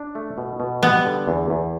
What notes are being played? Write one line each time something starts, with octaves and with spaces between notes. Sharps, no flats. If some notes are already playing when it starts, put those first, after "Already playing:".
Already playing: D4
A3
B2
B2
G3 B3
D3
E2
E2